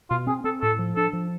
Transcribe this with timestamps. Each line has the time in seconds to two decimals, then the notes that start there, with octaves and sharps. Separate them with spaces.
0.10 B2 F4
0.27 C4 G#4
0.44 C4 A4
0.61 A2 A4
0.79 F3
0.96 D4 A4
1.13 F3